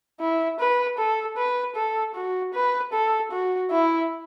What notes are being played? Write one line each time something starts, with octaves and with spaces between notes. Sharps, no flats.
E4
B4
A4
B4
A4
F#4
B4
A4
F#4
E4